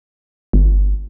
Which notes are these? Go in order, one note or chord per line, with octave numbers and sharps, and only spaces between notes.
G1